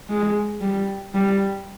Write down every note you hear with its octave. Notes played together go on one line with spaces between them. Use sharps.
G#3
G3
G3